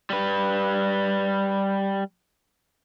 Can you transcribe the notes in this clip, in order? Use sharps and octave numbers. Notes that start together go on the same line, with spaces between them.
G3 B4